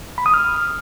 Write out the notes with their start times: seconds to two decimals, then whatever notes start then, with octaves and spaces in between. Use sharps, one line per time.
0.18 B5
0.26 D#6
0.34 F6